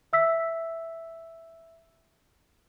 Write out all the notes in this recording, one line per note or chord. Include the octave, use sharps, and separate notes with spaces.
E5 E6 B6